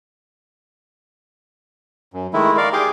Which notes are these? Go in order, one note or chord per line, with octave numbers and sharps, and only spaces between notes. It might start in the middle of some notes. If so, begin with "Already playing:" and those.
F#2
D#3 G#3 A3 E4
A#4 D5 F5
G4 G#4 C6 D6